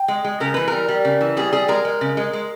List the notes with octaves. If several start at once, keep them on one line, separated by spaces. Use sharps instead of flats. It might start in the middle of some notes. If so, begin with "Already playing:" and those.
Already playing: G5
G#3
G#3
C#3 A#4
E3 B4
G3 A#4
G3
C#3
E3
G3 G#4
G3 G#4
G#3 A#4
G#3
C#3
G#3
G#3